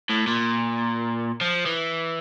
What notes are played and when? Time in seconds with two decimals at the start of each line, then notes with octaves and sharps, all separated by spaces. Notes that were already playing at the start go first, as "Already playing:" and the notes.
0.09 A2
0.27 A#2
1.41 F3
1.66 E3